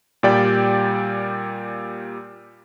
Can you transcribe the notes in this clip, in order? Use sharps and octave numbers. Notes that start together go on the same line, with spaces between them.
A#2 G3 D5 G5